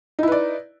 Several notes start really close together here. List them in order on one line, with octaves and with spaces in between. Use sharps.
D#4 E4 B4 D5